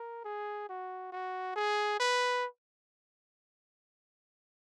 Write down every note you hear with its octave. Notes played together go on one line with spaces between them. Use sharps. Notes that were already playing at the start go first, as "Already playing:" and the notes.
Already playing: A#4
G#4
F#4
F#4
G#4
B4